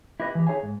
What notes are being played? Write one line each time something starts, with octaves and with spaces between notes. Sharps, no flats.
E4 G4 B4 D#5 E5
E3 G4
D#4 G#4 C#5 E5 F5 G#5
G#2